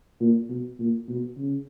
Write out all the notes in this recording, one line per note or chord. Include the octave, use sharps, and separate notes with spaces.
A#2
B2
A#2
B2
C#3